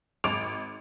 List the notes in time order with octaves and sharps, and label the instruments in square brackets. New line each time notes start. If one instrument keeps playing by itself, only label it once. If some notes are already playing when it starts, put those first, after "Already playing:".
[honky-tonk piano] G#1 D6 D7 F7